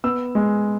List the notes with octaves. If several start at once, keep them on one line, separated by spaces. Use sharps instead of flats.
B3 E6
G#3